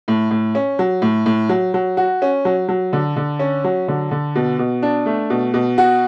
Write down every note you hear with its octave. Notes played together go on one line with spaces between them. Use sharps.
A2
A2
C#4
F#3
A2
A2
F#3
F#3
F#4
C#4
F#3
F#3
D3
D3
C#4
F#3
D3
D3
B2
B2
D4
A3
B2
B2
F#4